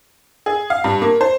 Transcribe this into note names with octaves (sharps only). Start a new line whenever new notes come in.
G#4
F5
G2
A#3
C5